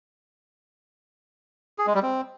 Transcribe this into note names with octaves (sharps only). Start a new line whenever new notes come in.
G#4
G#3
G3
C4